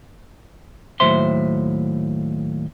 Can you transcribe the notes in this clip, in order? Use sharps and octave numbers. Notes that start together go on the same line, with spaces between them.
D#2 A2 F#3 C5 E5 C6